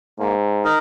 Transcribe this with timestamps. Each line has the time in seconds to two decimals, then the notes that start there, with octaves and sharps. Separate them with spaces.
0.19 G#2 A#3
0.64 D#4 A#4 D#5